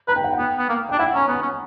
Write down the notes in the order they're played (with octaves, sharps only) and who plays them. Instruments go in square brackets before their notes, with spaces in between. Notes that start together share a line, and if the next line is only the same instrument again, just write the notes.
[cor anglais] B4 [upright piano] A#5
[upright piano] G5
F#5
[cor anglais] B3 [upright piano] G5
[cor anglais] B3
A#3
[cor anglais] D4 [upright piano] G5
[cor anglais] E4 [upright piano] F#5
[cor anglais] C#4 [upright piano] A#5
[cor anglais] B3 [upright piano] B5
[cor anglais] C#4